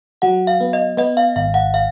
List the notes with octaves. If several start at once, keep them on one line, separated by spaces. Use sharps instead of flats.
F#3 F#5
F5
B3
D#5
B3 D#5
F5
G#1 F5
F#5
F5